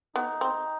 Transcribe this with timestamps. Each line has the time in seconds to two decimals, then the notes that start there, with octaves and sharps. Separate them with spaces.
0.15 B3 D#4
0.41 C4